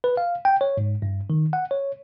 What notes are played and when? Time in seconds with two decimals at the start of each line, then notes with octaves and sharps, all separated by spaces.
0.04 B4
0.17 F5
0.45 G5
0.61 C#5
0.77 G#2
1.02 G2
1.30 D#3
1.53 F#5
1.71 C#5